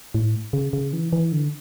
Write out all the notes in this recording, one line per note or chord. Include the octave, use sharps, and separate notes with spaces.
A2
C#3
C#3
E3
E3
D3